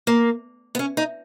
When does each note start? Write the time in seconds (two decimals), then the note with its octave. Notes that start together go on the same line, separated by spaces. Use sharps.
0.07 A#3
0.75 B3
0.79 C#4
0.97 D#4